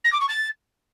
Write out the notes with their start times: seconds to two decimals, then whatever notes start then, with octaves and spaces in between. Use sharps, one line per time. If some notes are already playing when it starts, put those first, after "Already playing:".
0.04 A#6
0.12 D6
0.20 C#6
0.29 A6